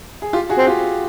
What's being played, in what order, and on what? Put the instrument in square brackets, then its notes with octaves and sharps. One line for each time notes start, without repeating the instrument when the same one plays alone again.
[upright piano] G#4
F4 G4
F#4 G#4
[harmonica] C4
[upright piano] F4 G4